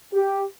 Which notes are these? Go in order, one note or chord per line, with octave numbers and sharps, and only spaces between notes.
G4